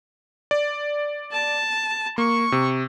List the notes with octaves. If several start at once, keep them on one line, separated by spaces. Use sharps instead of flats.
D5
A5
A#3 C#6
C3